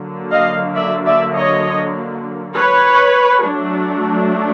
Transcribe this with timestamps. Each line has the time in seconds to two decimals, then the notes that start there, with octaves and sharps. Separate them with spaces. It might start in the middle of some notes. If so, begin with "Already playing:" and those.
Already playing: D3 F#3 A#3
0.31 D#5 F5
0.75 D5 E5
1.06 D5 E5
1.35 C#5 D#5
2.54 B4 C#5
3.44 F#3 A3 D4